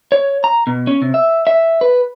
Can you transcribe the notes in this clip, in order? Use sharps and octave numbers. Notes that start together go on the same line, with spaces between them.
C#5
A#5
B2
C#4
C3
E5
E5
B4